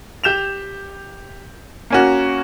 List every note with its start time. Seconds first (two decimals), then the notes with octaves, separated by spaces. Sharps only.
0.24 G4 G6 E7 F7
1.90 A#3 C#4 F#4